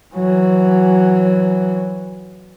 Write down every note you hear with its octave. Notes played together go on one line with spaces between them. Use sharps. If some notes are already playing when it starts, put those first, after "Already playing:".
E3 F#3